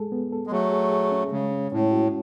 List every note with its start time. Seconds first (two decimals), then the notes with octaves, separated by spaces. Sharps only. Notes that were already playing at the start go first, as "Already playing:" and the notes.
Already playing: G#3 G#4 A4
0.12 B3
0.32 A4
0.47 G#3
0.52 F#3 A3 G#4
0.72 G#4
0.92 G#4
1.12 C#4
1.32 C#3 G#3
1.52 C#4
1.72 A2 C#4
1.91 F#4